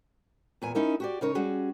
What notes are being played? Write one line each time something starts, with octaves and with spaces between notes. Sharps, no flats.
E2 A#2 G#5
C#4 D#4 E4 A#4
F#4 G4 D5
C#3 D#4 A#4 C#5
G3 C#4 F#4 G#4